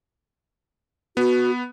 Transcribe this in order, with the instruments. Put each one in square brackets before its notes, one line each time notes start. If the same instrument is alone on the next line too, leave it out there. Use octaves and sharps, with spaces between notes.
[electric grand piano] B3 [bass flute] F#4